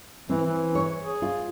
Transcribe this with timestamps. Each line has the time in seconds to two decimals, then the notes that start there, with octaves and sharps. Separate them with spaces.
0.29 E3 C4
0.46 E3
0.75 C#5
1.02 G#4
1.22 F4